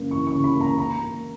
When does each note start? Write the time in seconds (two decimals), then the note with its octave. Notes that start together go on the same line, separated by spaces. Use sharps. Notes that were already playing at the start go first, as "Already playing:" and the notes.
Already playing: F#2 C#3 A#3
0.10 E3 C#6
0.27 C#6
0.32 C#3
0.44 B5
0.56 A#3 A#5
0.78 A#3 A#5
0.99 A#3